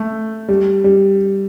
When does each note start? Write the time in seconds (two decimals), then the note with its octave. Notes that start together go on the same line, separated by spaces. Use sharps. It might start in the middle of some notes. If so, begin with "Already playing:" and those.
Already playing: A3
0.48 G3
0.84 G3